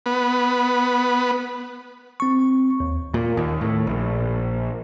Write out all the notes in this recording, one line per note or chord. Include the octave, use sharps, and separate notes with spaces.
B3
C4 C#6
D#2
A#2
D#2
A2
A#1